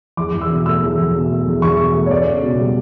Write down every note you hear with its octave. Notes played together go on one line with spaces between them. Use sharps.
E2 D6
E2
E6
B2
A3 E6
E2
E2
B2
A3
E2
E2 C#6
B2
A3
C#5
B3 D5
C#2
B2
G3